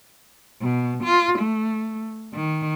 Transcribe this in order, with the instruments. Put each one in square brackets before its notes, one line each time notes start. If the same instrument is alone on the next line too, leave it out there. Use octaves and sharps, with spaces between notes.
[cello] B2
F4
A3
D#3